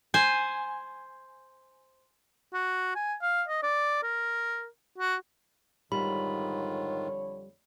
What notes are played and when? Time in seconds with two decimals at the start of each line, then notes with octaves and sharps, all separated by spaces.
0.14 C5 G#5
2.53 F#4
2.95 G#5
3.22 F5
3.48 D#5
3.63 D5
4.03 A#4
4.98 F#4
5.92 F2 G#2 D3 D#3 G3 F4 C#5 B5